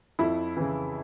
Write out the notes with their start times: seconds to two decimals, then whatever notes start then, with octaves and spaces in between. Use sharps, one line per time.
0.19 F2 E4
0.57 C#3 E3